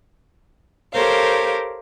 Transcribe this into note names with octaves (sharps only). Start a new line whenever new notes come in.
G4 A4 A#4 C5 C#5 F5